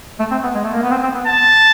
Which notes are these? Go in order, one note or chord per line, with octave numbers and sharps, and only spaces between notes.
A3
C4
B3
G#3
A3
A#3
B3
C4
C4
B3
A5